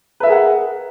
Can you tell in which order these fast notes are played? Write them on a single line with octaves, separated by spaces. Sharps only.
B4 E5 A#4 G#4 F#5